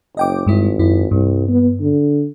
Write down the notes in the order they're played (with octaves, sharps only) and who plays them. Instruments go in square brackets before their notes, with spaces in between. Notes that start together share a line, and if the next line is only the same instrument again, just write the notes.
[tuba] F#1 [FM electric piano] D#5 G5 D6
[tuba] G#1 [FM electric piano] G2 G#3 E4
[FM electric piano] F#2 E4
[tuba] C2 [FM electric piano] G2
[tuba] B3
D3